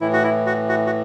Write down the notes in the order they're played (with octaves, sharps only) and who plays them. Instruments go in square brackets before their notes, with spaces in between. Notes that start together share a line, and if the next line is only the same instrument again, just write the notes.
[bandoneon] A2 E3 E4
F#4
E4
F#4
F#4
F#4